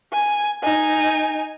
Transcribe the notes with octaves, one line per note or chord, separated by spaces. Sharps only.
G#5
D#4 G#5